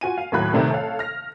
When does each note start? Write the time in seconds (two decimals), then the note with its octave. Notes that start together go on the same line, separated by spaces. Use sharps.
0.01 F4 F#4 G#5 D#7
0.18 F5
0.32 D#2 A2 F#3 B5 F#6 G#6
0.53 C3 D#3 G3 A3
0.70 A4 C#5 F5
0.99 F6 A#6